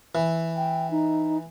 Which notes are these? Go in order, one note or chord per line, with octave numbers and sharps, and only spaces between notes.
E3
G5
D#4